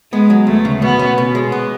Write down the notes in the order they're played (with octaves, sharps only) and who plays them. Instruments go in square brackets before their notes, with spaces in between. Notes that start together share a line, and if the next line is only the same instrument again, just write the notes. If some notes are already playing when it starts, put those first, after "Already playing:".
[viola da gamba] G#3 [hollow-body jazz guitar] B3
[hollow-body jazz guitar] F#3
[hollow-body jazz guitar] D2 [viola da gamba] A3
[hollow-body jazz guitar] C#3
[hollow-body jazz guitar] B2 [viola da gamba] B3
[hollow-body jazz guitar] C#4
B2
G#3
B3